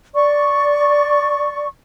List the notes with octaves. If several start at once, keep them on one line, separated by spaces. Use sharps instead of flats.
D5 C#6